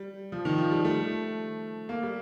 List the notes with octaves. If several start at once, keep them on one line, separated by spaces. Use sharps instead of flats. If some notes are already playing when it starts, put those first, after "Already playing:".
Already playing: G3
F3
D#3
F3
G3
A3
A#3
G3